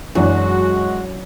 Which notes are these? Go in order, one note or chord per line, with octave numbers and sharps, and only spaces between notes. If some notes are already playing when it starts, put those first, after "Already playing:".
F#2 E3 F#3 G#3 D4 F#4